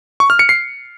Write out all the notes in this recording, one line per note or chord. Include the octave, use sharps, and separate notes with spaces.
C#6
F6
C#7
C7